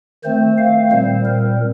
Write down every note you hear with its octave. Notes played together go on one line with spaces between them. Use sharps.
D#3 A3 C4 C5
F5
A#2 G3 C4 C5
A#4